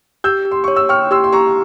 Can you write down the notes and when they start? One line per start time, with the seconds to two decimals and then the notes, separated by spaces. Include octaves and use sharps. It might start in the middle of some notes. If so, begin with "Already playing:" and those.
0.24 G4 E6 G6
0.45 G4
0.51 C6
0.64 C#5 C#6
0.76 E6
0.89 G5 C#6 F6
1.11 G4 C6 E6
1.24 C6
1.32 G4 A#5 C#6